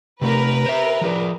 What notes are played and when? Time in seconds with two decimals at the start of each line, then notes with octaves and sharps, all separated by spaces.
0.21 C3 A3 A#4 B4
0.66 C5 E5
1.01 F3 G#4 D5